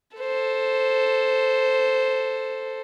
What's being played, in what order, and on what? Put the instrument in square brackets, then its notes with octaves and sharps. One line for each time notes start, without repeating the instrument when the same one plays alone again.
[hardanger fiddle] A4 C5